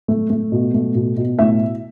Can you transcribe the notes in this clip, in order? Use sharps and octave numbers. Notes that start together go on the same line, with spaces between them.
A3
A3
B2
A3
B2
B2
A2 E5